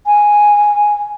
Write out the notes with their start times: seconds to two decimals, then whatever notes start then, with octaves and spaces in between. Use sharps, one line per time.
0.06 G#5